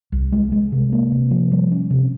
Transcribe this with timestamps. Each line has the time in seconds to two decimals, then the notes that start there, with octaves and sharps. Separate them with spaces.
0.12 C2
0.32 G#3
0.52 G#3
0.72 C3
0.92 A#3
1.12 C3
1.31 F3
1.51 G3
1.71 C#4
1.91 C3